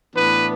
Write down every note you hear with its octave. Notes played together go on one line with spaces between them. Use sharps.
A2 E3 B3 D4 B4